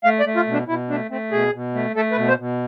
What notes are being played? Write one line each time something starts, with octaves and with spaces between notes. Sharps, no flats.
A3 F5
D5
A3
F4
B2
D4
B2 E4
A3 D4
A3 C4
B2 G#4
B2
A3
A3 A4
B4
B2
C5
B2